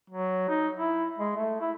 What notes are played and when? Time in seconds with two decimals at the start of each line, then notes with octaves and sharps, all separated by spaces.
0.10 F#3
0.49 D#4
0.77 E4
1.18 G#3
1.36 A3
1.61 E4